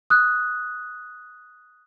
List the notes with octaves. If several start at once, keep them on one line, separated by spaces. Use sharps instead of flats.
D#6 F#6